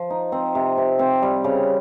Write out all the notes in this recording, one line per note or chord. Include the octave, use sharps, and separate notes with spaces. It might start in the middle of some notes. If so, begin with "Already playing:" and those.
Already playing: F3
D#4
C4
C3
C3
C4
G3
C#3